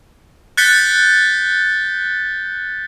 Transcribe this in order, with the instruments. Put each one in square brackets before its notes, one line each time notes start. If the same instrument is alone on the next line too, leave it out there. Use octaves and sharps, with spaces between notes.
[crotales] F#6 G6 A6 B6 C#7 G7